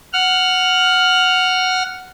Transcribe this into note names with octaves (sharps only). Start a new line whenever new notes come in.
F#5 F6